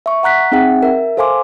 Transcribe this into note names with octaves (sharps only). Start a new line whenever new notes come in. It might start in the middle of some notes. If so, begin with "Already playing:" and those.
E5 C#6
F#5 A#5 F#6 B6
C4 D#4 G#4 E5 F#5 G5
A#4 E5
A4 C5 F5 G#5 C6 D6